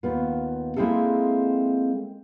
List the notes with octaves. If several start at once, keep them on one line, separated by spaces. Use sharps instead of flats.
D#2 B3 F4
G#3 A#3 C4 E4 G#4 A4